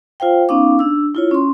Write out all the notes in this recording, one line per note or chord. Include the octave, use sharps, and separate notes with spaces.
F4 C5 F5 G5
B3 C#4 D#4 F5 D6
D4 E6
E4 F4 C#5
C#4 C6